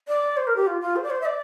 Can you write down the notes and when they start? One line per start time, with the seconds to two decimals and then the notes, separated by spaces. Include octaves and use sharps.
0.08 D5
0.37 C5
0.47 A#4
0.56 G4
0.67 F4
0.81 F4
0.96 C5
1.03 D5
1.10 C5
1.21 E5
1.26 D5